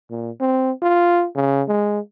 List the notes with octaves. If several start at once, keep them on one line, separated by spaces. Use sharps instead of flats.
A#2
C4
F4
C#3
G#3